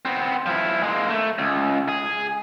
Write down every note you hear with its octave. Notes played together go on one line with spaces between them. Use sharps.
B3 C4
F3 E4
G#3 A#3
A3
C#2
G#4